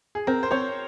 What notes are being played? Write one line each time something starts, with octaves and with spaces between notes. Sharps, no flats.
G#4
C4 A#4
C5
C4 C#5